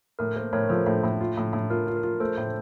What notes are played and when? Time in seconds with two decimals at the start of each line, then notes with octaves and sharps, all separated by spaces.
0.19 A2 A#4
0.36 A#3 A4 C5
0.53 A2 A#4 C#5
0.69 F3 A4 C5
0.86 A2
1.03 A2
1.21 F4
1.37 A2
1.53 A2
1.70 F4 A#4
1.87 F4
1.96 A#4
2.03 F4
2.20 A3 A4 C5
2.38 A2